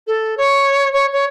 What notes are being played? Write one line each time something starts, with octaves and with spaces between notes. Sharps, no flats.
A4
C#5
C#5
C#5